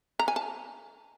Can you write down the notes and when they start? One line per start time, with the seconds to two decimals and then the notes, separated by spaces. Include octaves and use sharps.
0.19 A#5
0.28 G#5
0.36 A5